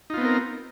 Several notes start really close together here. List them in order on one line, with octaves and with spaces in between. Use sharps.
D#4 F4 B3 C4 A#4